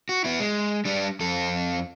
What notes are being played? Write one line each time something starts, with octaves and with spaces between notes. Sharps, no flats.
F#4
B3 E4
G#3
G3 D4
F2 A4